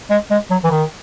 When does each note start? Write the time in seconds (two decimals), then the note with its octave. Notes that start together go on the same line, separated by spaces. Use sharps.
0.10 G#3
0.30 G#3
0.51 F#3
0.64 E3
0.71 D#3